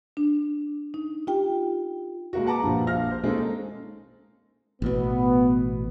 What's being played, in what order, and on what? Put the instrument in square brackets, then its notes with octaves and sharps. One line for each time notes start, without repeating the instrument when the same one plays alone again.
[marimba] D4
D#4
F4 G4 G5
[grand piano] G#3 A#3 F#4
G#4 B4 F#5 A5 A#5 D6
G2 A#2 F3
A#1 F5 F6 A#6
C5
G#3 A#3 C#4 D#4 G#4 A4
[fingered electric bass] A1 B2 [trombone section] B3